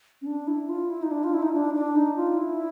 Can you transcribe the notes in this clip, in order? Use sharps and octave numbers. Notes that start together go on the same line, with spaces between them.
C#4
D4
E4
F4
E4
D#4
D4
F4
E4
D#4
D4
D4
D#4
F4
E4